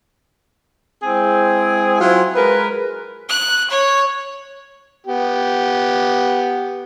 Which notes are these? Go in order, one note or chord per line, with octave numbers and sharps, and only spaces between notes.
G#3 C4 E4 G#4
F#3 C4 E4 F4
G#3 A#4 B4
F#6
C#5
B3 G4